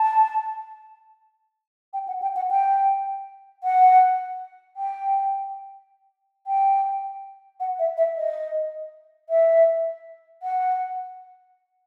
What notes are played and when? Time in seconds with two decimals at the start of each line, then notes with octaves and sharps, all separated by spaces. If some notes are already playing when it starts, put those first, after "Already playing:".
Already playing: A5
1.94 G5
2.08 F#5
2.22 G5
2.36 F#5
2.51 G5
3.64 F#5
4.77 G5
6.47 G5
7.60 F#5
7.79 E5
7.97 E5
8.17 D#5
9.29 E5
10.43 F#5